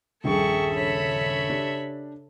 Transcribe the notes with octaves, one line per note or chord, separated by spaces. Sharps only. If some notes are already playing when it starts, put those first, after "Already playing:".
D#1 A#1 G2 G#4 A4 E5 G5 C#6
C#3 C#5 B5
D4 G4